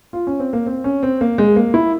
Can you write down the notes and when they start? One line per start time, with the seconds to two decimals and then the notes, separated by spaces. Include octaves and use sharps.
0.13 F4
0.27 C#4
0.40 C4
0.53 A#3
0.67 C4
0.84 C#4
1.03 C4
1.21 A#3
1.38 G#3
1.56 A#3
1.74 E4